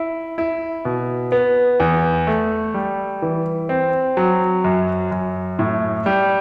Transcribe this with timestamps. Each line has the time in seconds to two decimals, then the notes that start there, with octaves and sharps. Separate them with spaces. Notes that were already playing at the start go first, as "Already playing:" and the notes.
Already playing: E4
0.38 E4
0.85 B2
1.32 B3
1.80 E2
2.27 A3
2.74 G3
3.22 E3
3.69 C4
4.17 F#3
4.64 F#2
5.11 F#2
5.59 A2
6.06 G3